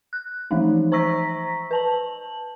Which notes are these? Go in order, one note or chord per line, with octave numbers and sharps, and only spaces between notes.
F#6
E3 F3 G#3 A3 D#4
C5 A#5 C#6 E6 A#6 B6
B4 A5 F#7